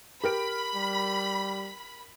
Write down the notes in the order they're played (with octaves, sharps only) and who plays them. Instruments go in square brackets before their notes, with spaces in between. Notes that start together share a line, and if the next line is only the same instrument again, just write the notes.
[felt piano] G4 A#4 D7 [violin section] B5
[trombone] G3